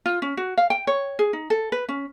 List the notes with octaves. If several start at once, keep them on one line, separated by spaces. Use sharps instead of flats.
F4
C#4
F#4
F5
G5
C#5
G#4
D#4
A4
B4
C#4